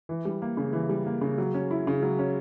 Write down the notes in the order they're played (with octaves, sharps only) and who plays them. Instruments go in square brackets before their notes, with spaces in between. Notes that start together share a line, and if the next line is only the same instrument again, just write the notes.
[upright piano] E3
G3
A#3
C#3
E3
G3
A#3
C#3
F#3
C#4
E4
C#3
F#3
C#4